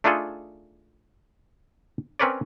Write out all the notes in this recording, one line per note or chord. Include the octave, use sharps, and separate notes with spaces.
A3 D4 D#4 F4 G#4 A4
C4 C#4 A#4 B4 C#5 D5